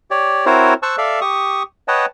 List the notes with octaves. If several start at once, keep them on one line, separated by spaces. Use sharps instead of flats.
G4 C#5 D5
C4 E4 F#4 A#4 C5 C#5
C5 A5 C#6 E6 F#6
A4 D5 E5 F5
G4 C#6 D#6
B4 C#5 D#5 F#5 G5 A5